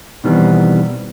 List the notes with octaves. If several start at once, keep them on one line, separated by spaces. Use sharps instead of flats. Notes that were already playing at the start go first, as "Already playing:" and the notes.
B2 D#3 E3 G3 B3 C4